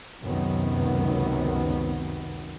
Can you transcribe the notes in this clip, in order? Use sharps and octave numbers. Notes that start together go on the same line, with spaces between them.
C#2 F#2 C3 D#3 B3